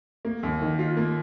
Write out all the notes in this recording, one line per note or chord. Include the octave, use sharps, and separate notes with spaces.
A#3
D#2
D#3
F4
A#3